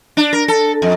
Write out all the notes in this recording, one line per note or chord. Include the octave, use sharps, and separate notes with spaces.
D4
A#4
A4
F2